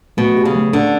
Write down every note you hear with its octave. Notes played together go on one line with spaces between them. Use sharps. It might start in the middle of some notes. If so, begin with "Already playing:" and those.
B2 A3
G4
C#3
A3
D3 C#4